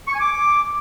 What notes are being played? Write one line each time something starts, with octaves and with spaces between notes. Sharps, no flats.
C#6
G#5
D6